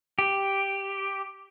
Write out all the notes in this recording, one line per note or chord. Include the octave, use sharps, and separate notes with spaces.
G4